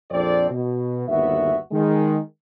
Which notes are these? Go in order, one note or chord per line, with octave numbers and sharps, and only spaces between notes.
A#1 F2 F3 C4 A4 D5
B2
G1 D#2 B3 F#4 E5
D#3 G#3